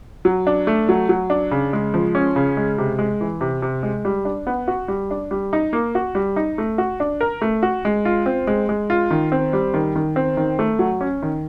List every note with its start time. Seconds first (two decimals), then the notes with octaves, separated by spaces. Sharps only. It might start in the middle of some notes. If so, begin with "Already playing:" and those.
0.25 F#3
0.47 D4
0.67 A3
0.89 F#3
1.09 F#3
1.30 D4
1.51 C#3
1.73 G#3
1.94 F3
2.15 C#4
2.36 C#3
2.57 G#3
2.78 C3
2.99 G#3
3.21 E3
3.41 C3
3.62 C3
3.83 G#3
4.05 G3
4.25 D4
4.47 B3
4.68 F#4
4.88 G3
5.11 D4
5.31 G3
5.53 D#4
5.73 A#3
5.95 F#4
6.15 G3
6.36 D#4
6.58 A3
6.78 F#4
7.00 D4
7.21 A#4
7.41 A3
7.63 F#4
7.85 G#3
8.05 F4
8.26 C4
8.47 G#3
8.69 G#3
8.90 F4
9.11 D#3
9.32 C4
9.53 G3
9.74 D#3
9.96 D#3
10.16 C4
10.37 D#3
10.59 A3
10.79 F#3
11.01 C#4
11.22 D#3